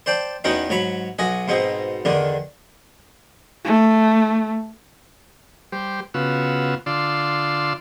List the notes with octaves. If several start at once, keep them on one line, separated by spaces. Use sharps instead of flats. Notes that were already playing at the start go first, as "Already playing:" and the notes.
C5 D5 G5 A5
E2 B3 C#4 D#4 F#4 G5
G#2 F#3 C#5 B5
B1 F#4 D#5 G#5
G#2 B2 C4 D#4
E2 D3 D#3 D4
A3
G3 G4 C5
C#3 B3 F4 F#4 E6
D3 F4 D5 C6 E6